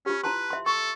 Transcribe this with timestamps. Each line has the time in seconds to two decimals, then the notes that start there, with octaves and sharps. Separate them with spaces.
0.06 C#4 F4 G4
0.24 E4 B4 A5 C6
0.50 E5 C6
0.66 A4 C#6